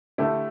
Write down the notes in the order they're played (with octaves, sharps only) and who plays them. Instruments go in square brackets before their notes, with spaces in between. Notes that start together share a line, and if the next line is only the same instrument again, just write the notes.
[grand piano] D3 A3 E4 G4